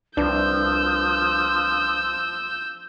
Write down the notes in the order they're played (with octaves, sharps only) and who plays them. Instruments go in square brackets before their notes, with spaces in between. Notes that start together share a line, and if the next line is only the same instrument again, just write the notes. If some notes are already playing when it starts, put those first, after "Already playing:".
[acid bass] C2 [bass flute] F3 [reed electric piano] D4 B4 [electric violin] E6 G6